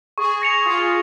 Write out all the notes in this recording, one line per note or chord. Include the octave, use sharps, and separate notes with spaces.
G#4 C#6
A#6 C#7 F7
F4 D#6